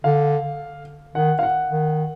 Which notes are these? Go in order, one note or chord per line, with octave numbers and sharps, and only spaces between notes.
D3 F5
D#3 F#5
F5
F#5
D#3